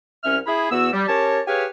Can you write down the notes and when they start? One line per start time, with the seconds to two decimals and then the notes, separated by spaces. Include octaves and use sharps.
0.24 C2 C#4 E5 F6
0.47 E4 G#4 B5
0.72 E2 B3 F#4 E6
0.93 G3
1.08 C#4 G4 A#4 C#5 A5
1.48 G4 G#4 B4 C#5 F5 G#5